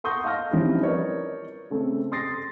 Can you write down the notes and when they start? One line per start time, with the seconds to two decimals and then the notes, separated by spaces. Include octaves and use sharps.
0.04 F#5 C6 C#6 D#6 G6 A#6
0.24 D#5 F5 A5 F6 A#6
0.51 F3 G3 C4 C#4 D#4 E4
0.82 A#4 B4 C#5 D5
1.70 C#3 A3 C4 A4
2.12 C6 D#6 A6 A#6 C7